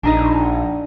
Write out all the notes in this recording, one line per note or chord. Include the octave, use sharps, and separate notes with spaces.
A#1 D4 D#4 D#5